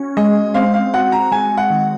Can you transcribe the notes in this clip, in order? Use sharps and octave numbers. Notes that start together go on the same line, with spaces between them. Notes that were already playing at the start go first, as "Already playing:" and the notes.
Already playing: C#4 F#4
G#3 D#5
C4 F5
F5
F#4 F#5
A#5
G#3 G#5
F#5
D#3